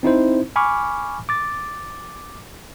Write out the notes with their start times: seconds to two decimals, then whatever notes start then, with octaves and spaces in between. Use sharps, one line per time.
0.03 C4 D#4 E4 C5
0.56 G#5 B5 C#6 D6 F6
1.29 D6 A6